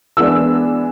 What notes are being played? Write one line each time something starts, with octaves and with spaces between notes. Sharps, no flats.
E3 G#3 B3 D4 E6